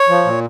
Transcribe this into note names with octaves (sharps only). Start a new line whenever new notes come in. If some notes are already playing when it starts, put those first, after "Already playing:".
Already playing: C#5
F3
A#2